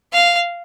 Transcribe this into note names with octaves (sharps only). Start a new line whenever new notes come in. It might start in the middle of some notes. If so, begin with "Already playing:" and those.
F5